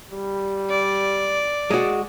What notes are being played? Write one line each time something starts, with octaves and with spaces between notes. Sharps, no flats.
G3
D5
G#3 F#4